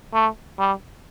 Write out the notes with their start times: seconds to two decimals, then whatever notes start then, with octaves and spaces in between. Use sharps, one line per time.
0.13 A3
0.59 G3